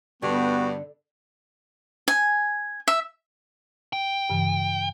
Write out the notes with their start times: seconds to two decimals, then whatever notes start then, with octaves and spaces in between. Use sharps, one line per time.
0.22 G2 D3 B3 F#4
2.08 G#5
2.88 E5
3.93 G5
4.30 G2 C#3 E3